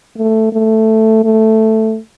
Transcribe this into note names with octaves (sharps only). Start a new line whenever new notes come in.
A3
A3
A3